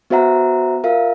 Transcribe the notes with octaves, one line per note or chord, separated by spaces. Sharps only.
B3 F#4 C5 E5 F#5 A#5
F4 A#4 E5 F5